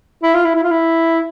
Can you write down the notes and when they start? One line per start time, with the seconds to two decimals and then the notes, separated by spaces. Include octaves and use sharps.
0.23 E4
0.34 F4
0.44 E4
0.55 E4
0.63 F4
0.70 E4